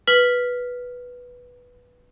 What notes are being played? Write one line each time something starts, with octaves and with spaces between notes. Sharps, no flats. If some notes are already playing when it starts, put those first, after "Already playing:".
B4 F6 B6 F#7